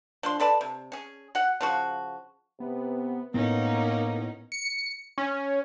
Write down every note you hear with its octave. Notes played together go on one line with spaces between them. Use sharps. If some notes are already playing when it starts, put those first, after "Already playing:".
F3 D4 C6
A4 B4 D5 A5
C3
C#4 G#4
F#4 F#5
C#3 F3 F#4
C3 B3
A2 A#3 B3 C#4 D#4 A#4
C#7
C#4